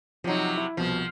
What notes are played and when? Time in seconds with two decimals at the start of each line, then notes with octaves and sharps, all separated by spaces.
0.24 C3 F3 F#3 D#4
0.57 E4
0.77 C2 B2 F3